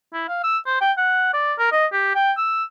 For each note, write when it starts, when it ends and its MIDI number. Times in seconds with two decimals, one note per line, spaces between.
0.13 0.25 64
0.28 0.42 77
0.43 0.58 88
0.66 0.76 72
0.81 0.92 79
0.97 1.30 78
1.33 1.53 74
1.59 1.71 70
1.72 1.86 75
1.93 2.10 67
2.15 2.32 79
2.38 2.64 88